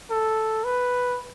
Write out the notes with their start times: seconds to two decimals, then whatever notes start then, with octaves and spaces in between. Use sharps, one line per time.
0.11 A4
0.64 B4